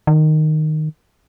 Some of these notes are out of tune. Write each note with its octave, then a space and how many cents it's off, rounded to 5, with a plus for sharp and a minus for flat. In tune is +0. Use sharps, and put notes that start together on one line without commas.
D#3 -10